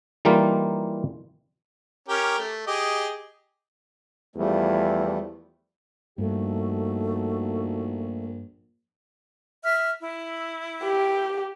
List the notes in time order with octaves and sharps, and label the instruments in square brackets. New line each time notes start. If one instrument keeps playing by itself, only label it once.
[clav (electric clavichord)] E3 G3 A#3 D#4 F4
[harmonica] C#4 G4 A#4
A3
G4 G#4 D#5
[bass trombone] E2 [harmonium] F3 G3 A3
[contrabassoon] A#1 [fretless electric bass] G2 [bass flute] A3 [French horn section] D#4 F#4
[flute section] E5 F6
E4
[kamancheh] G4